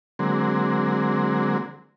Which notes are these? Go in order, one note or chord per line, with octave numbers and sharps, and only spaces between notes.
D3 F#3 G#3 A#3 C4